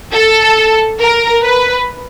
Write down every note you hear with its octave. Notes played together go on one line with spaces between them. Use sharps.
A4
A#4
B4